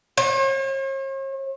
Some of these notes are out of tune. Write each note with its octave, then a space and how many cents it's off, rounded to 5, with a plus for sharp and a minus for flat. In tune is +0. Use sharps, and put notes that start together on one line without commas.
C#5 -45